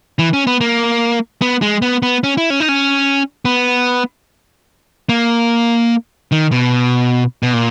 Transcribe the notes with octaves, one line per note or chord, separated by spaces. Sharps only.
E3
C#4
B3
A#3
B3
G#3
B3
B3
C#4
E4
C#4
D#4
C#4
B3
A#3
D#3
B2
B2
A#2